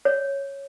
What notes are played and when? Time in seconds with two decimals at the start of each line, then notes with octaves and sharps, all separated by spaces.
0.05 C#5